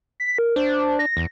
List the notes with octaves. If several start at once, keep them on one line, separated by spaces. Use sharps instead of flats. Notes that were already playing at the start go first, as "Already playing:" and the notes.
B6
A#4
D4 C5
A#6
E2